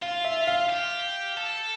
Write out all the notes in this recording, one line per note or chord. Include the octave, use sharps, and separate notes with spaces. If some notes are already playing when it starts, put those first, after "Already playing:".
F4 F5
E5
F5
G4
A4